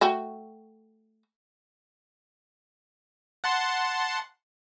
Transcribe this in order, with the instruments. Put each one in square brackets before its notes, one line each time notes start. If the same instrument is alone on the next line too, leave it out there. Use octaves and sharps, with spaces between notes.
[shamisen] A3 F#4 G5
[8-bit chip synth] F#5 A5 C6